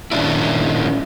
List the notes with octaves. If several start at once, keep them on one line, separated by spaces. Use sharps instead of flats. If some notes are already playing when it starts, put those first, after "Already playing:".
A#2 D#3 F3 C#4 D4 E4